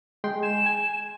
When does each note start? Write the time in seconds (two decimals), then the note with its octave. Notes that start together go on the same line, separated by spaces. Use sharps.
0.24 G#3 G5 C6
0.43 G#5 E7
0.66 G#5